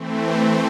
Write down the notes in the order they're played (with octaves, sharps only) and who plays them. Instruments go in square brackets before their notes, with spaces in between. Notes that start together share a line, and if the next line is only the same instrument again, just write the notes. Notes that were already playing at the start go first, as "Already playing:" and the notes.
Already playing: [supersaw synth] E3 A3 C4